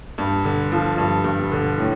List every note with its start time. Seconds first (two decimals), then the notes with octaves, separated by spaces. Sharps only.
0.18 G2
0.44 D3
0.72 F3
0.98 G2
1.24 G2
1.52 D3
1.78 A2